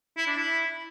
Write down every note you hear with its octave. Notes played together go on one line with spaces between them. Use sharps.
E4
D4
E4